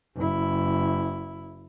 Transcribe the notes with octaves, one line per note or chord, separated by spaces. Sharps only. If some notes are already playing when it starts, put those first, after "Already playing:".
F#1 E4